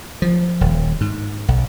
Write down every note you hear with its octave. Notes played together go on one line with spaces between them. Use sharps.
F3
D#1
G#2
B1